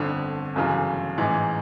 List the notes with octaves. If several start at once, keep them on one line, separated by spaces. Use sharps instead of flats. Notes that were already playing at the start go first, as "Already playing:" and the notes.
Already playing: G1 F2 D3
G1 F#2 C#3 E3
A1 G#2 E3 G#3